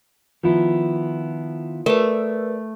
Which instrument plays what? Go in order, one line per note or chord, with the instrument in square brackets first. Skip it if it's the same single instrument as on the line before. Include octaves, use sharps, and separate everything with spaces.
[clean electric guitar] D#3 B3 E4 [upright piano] F3
[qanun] A3 [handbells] A#4 B4 [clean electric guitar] D5